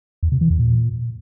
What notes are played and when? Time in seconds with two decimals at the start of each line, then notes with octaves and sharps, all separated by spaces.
0.23 E2
0.32 C3
0.41 E3
0.50 E2
0.59 A#2